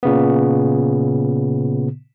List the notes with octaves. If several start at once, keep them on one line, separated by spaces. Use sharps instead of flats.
A#2 C#3 B3